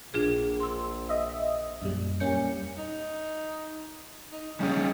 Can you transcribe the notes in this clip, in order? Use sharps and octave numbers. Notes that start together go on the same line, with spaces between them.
A#1 D4 F4 G#4
C6 E6
D#5 E5
F#2 A#2 G3
E2 G3 A#3 C#4 G6 C#7
D#4
D#4
C#3 G3 C#4 D#4